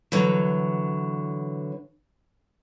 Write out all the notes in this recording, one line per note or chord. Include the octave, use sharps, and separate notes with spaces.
D3 E3 F#3